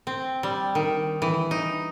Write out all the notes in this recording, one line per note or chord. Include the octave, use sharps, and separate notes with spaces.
C4
G3
D#3
E3
D#4